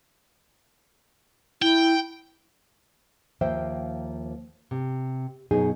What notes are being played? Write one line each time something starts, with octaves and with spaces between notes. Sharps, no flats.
E4 G5
D#2 F3 A#3 C5 E5 G5
C3
F#2 B2 B3 D#4 G#4